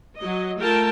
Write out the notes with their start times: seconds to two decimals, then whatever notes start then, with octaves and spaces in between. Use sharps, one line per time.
0.17 F#3 D#5
0.58 A3 F4 A#4 G5 A5